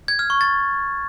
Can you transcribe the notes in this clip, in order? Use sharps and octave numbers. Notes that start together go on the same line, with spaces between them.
G#6
F6
C#6
A6